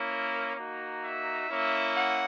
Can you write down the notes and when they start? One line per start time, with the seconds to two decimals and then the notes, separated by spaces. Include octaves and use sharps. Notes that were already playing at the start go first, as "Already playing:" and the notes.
Already playing: A#3 C#4 E4
0.09 A#4
0.56 A#3 D#4 F#4
1.03 E5
1.50 A#3 C#4 E4
1.96 F#5